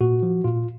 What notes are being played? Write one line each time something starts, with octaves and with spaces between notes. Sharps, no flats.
A#2 F#4
F3
A#2 F4